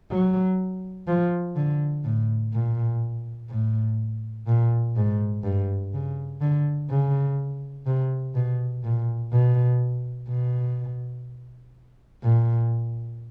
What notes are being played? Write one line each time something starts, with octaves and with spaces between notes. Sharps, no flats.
F#3
F3
D3
A2
A#2
A2
A#2
G#2
G2
C#3
D3
C#3
C3
B2
A#2
B2
B2
A#2